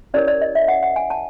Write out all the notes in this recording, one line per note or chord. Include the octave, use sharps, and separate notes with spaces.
C#4 E4 G4 A#4 C#5 D5
D5
D#5
E5
F#5
F#5
G#5
A5